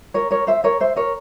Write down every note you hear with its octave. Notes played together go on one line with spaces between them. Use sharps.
A#4 C#5
A#4 C#5
C5 E5
A#4 C#5
C5 E5
A#4 C#5